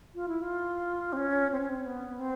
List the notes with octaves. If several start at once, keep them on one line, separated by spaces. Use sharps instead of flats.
F4
E4
F4
C4
C#4
C4
C#4
C4
B3
C4